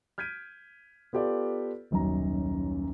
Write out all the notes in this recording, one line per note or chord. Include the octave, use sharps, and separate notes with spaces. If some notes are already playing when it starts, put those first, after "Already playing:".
F6 G6 G#6 B6 D7 D#7
B3 F4 G4 A4 D5
D#1 B1 F#2 A#5